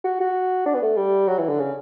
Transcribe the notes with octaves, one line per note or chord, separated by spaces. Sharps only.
F#4
F#4
D4
B3
A3
G3
F#3
E3
D3
C#3